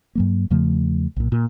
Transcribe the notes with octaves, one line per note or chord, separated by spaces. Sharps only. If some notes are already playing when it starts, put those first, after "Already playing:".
G2 F#3 A#3
E2 C#3 F3 A3
B1 A#2
A#2